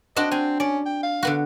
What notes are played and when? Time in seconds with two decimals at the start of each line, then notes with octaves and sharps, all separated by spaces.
0.16 C4 D4 F#4 D#5
0.31 C4 G#5
0.60 C#4 D5
0.86 G5
1.03 F5
1.23 D3 B3 F#4